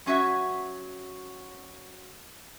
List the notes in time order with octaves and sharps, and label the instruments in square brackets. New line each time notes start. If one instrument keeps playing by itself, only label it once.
[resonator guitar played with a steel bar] F#3 C#4 F#4 E5